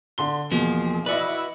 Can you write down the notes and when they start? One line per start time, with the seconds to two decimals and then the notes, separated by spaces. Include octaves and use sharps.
0.18 D3 C6 G7
0.51 E2 B2 F3 A#3 G#4
1.06 E4 F#4 B4 D5 D#5